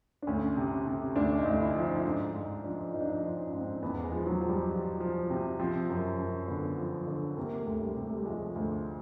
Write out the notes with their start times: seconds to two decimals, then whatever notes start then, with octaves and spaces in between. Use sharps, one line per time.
0.22 D4
0.27 D2 C#4
0.57 C3
0.86 C3
1.16 D2 D4
1.38 D#4
1.45 D2
1.60 E4
1.75 F3
1.82 D#4
2.05 G#2 D4
2.34 G#2
2.64 F3 D4
2.94 F3 D#4
3.01 D4
3.08 D#4
3.23 F3
3.38 C#4
3.53 G#2
3.60 C4
3.82 E2 B3
4.04 G#3
4.12 F3
4.26 F#3
4.41 F3
4.49 G3
4.71 F3
5.00 F3
5.30 C3
5.59 F3 C4
5.89 F#2
6.19 F#2
6.48 D3 B3
6.78 F3
7.07 D3
7.37 C3 A#3
7.59 A3
7.67 D2
7.81 G3
7.96 C3
8.04 A3
8.15 G3
8.26 F3 G#3
8.56 D2